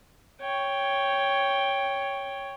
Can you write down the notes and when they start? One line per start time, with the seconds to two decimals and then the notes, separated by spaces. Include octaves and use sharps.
0.42 C#5 G5